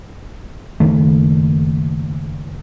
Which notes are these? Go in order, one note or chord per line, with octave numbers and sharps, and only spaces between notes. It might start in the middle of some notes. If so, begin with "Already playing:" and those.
F#1 E2 D#3 A3